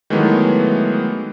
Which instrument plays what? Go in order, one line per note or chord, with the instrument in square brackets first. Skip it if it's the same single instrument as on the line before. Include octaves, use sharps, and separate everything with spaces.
[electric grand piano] D#3 E3 F#3 G#3 A3 B3